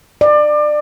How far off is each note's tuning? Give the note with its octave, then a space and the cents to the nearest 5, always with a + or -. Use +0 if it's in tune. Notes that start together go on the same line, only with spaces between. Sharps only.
D5 +25